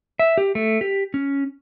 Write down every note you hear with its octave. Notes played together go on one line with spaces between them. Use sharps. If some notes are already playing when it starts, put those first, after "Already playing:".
E5
G4
A3
G4
C#4